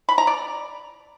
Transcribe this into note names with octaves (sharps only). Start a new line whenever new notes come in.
B5
A#5
D5